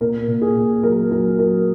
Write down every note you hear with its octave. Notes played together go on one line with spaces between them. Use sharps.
A#2 A#4
A#2
G#4
A#2
F#3 A#4
F#3 A#4
F#3 A#4